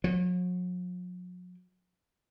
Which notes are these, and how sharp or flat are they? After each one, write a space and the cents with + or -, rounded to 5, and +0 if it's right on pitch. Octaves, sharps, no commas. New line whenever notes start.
F#3 -45